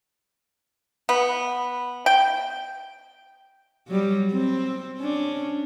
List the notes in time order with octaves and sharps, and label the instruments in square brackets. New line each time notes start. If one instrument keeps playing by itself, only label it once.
[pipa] B3
G5
[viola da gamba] F#3 G3
C4
C#4 D4